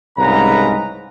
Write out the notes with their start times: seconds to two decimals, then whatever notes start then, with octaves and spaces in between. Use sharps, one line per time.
0.18 C2 G#2 C#3 B4 A#5